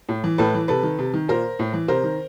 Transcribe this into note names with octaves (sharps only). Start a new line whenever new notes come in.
A2
E3
A2 A4 B4
E3
C3 A4 B4
D#3
C3
D#3
A#2 A#4 C5
A2
E3
C3 A#4 C5
D#3